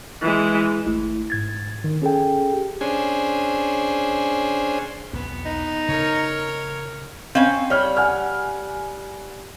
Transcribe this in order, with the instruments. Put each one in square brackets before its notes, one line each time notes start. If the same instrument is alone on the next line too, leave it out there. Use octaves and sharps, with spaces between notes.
[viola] E3 G#3
[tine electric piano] G#1 A3 E4
G#2 G#6 A6
D#3
C#4 G#4 A4 G5
G4
[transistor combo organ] C#4 D4 G#4 C5 G#5
[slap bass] B1 E2 C4 [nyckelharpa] B3
[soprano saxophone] D#4
[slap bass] C#3 [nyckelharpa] A#4 C#5
[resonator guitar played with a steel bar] C4 C#4 [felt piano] F5
[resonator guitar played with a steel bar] G3 [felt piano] C#5 F6
[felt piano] F#5 G#5 F6